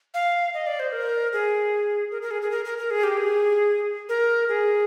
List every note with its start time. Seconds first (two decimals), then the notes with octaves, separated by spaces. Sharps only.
0.14 F5
0.54 D#5
0.67 D5
0.80 C5
0.92 A#4
1.33 G#4
2.11 A#4
2.22 A#4
2.31 G#4
2.42 G#4
2.51 A#4
2.65 A#4
2.78 A#4
2.91 G#4
3.03 G4
3.17 G#4
4.09 A#4
4.49 G#4